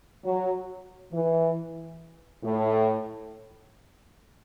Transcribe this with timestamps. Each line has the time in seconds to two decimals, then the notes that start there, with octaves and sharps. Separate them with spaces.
0.25 F#3
1.12 E3
2.44 A2